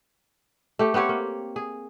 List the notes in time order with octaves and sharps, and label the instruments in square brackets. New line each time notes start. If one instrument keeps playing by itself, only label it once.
[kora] A3 G4
B3 C4 G4 C#5
A#3
G#4